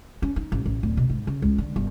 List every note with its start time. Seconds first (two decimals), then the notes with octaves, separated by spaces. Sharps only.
0.22 C#4
0.36 D#4
0.52 A1
0.66 A1
0.83 D1
0.97 B2
1.10 G#2
1.27 C#3
1.42 C#2
1.58 D3
1.76 G1